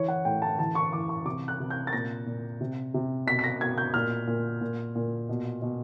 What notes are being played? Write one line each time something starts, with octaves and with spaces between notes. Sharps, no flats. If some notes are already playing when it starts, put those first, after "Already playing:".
Already playing: E3 C#5
F#5
A2 G5
A5
E3 A5
C#6
E3 D6
C#6
C3 D6
F#6
C3
G6
A6
A#2 A#6
A#2
C3
C3
B2 B6
B6
A#6
B2 G#6
G6
A#2 F6
A#2
A#2
A#2
B2
B2